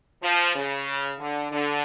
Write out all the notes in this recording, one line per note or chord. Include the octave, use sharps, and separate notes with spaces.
F3
C#3
D3
D3